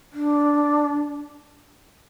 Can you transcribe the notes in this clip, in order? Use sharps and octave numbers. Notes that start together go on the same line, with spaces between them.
D4